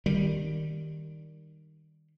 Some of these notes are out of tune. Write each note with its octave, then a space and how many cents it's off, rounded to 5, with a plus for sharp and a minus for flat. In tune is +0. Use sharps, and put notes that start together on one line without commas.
D#3 +0 G3 +0